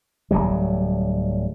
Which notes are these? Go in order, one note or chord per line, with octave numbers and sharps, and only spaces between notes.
D1 F2 F#3 G3